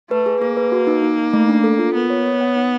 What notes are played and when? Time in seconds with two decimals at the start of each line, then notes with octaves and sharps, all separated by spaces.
0.10 A3 B4
0.26 G#4
0.41 A#3 G#4
0.57 B4
0.72 F#4
0.87 D#4
1.02 D#4
1.18 D#4
1.33 A3
1.49 D4
1.64 A4
1.79 F4
1.94 B3 A#4
2.10 C#5
2.26 C#5
2.41 F#5
2.56 D#4